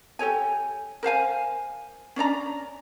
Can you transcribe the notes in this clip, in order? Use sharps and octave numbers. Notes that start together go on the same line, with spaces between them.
G4 A4 C#5 G#5
A#4 C5 F5 G#5
C#4 D4 D5 A#5